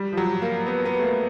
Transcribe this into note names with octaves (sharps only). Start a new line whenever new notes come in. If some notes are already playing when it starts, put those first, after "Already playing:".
Already playing: G3
F3
F#3
A#3
B3
B3
A3
A#3